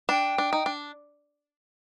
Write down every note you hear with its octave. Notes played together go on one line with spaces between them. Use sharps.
D4 G5
D4
D#4
D4